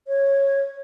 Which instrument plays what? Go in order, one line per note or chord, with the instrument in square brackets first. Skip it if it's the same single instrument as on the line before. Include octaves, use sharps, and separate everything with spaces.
[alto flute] C#5